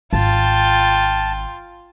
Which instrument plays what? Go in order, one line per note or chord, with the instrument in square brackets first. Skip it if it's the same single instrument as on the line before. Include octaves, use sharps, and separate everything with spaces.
[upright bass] G#1 [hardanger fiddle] F4 G5 [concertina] A5